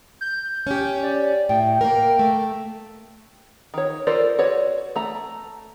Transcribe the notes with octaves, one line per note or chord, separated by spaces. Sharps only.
G6
C#4 G4
D5
A2 G5
A#3 A#4
A3
D#3 C#5
F4 A4 A#4 C5 D5
F#4 B4 C#5 D5
A3 A#5